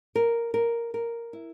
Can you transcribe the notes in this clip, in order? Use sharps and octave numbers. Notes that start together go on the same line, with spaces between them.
A#4
A#4
A#4
E4